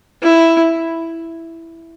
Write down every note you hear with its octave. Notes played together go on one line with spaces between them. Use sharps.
E4